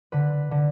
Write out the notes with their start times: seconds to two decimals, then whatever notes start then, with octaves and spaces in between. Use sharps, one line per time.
0.12 D3 B4
0.51 D3